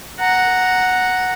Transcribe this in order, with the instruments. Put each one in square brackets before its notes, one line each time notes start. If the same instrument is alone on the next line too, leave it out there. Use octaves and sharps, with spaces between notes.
[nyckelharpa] F#5 A#5